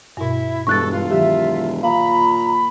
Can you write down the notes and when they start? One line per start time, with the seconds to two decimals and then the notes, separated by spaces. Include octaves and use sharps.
0.17 G2 B2 E4
0.67 E1 G2 A4 C#6 F#6 A6
0.91 F4
1.11 D#3 F#3 G4 E5
1.83 A#2 F5 A#5 B5